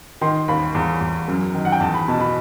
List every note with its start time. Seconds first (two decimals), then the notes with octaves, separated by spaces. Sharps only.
0.21 D#3 C6
0.48 D#2 B5
0.75 E2
1.01 E2
1.28 F#2
1.55 D#3
1.65 F#5
1.72 G5
1.80 E2 A5
1.94 B5
2.08 B2 A5
2.20 B5